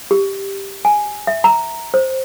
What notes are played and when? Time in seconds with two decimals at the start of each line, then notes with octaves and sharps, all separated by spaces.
0.11 G4
0.85 G#5
1.27 E5
1.44 A#5
1.94 C5